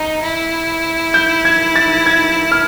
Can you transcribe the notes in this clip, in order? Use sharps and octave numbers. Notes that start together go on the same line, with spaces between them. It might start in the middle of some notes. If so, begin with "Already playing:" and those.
Already playing: D#4
E4
G6
G#6
A6
G#6
F6